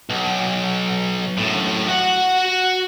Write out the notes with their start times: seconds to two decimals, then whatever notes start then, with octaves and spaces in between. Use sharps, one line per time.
0.10 B1
1.38 F#2 A2
1.88 F#4 F#5